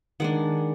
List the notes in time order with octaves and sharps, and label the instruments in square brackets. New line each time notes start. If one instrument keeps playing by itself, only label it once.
[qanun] D#3 G#3 D4 F#5